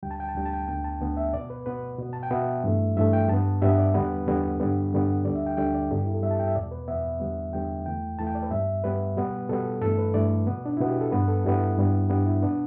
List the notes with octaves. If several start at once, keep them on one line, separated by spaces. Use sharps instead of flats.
D2 D3 G3 G5
A5
G5
A5
D2 D3 G3 G5
A5
G5
D2 D3 B3 G5
A5
D2 D3 B3
E5
B2 B3 D5
B4
B2 B3 B4
B2 B3
A5
G5
B2 B3 E5
G2 E3 A3
G2 E3 A3 E5
G5
G2 G3 B3 A5
G2 G3 B3 E5
D5
E2 D3 G3 B3 B4
E2 D3 G3 B3
G2 D3 G3 B3
G2 D3 G3 B3
D2 D3 G3 D5
E5
G5
D2 D3 G3 G5
D5
G2 G3 B3 A4
G4
E4
A4
G2 G3 B3 E5
A5
G5
E5
E2 B2 B3 D5
B4
E2 B2 B3 E5
E2 D3 G3 B3
E2 D3 G3 B3 G5
E2 E3 A3 G5
E2 E3 A3 A5
G5
D5
B4
G2 G3 B3 E5
G2 G3 B3 B4
B2 G3 B3
B2 G3 B3 A4
G2 E3 A3 A4
B4
G2 E3 A3 D5
B2 B3
D4
B2 B3 E4
G4
A4
G2 G3 B3 B4
A4
G2 G3 B3 E4
G2 G3 B3
G2 G3 B3 D4
E4
B2 B3 D4